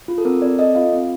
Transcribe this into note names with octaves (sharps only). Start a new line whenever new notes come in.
F4
A4
C4 A#4
C4 D5
A4 D#5
F4 F5
C4